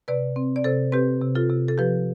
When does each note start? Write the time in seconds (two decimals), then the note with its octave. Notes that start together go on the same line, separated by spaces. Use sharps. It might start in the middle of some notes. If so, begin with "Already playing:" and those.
0.08 C3 B4 D5
0.36 C4
0.56 D5
0.64 C3 A4 C5
0.92 C4 G4 B4
1.21 C3
1.35 F4 A4
1.49 C3
1.68 A4
1.78 F3 G4 B4